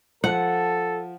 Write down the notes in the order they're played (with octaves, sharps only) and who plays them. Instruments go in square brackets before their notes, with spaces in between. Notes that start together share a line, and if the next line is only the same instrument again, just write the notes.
[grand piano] F3 [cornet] A4 [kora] F#5